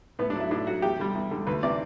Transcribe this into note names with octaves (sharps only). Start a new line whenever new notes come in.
A2 B3
D4
F#3 A3 E4
A2 D4
F#3 A3 F#4
E2 G4
D3 G3
E2
D3 G3
D2 B4
C3 E3 A3 D5